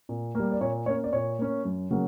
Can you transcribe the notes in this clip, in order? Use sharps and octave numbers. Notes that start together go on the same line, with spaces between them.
A#2
G3 A#3
D5
A#2 C#5
A#3 C#4 C#5
D5
A#2 C#5
A#3 C#4
F#2
C#3 F#3 A#3 C#4